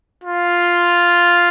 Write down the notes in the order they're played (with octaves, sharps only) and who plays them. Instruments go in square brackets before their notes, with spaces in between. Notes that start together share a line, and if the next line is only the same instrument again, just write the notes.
[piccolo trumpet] F4